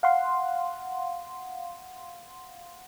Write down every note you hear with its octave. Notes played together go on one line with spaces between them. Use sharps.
F5 F#5 C6